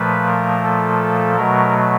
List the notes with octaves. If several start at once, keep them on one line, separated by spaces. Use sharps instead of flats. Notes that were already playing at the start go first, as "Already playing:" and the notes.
Already playing: A#2 F3 A3 B4
A#4
A4
B2 F#3 A3 A#4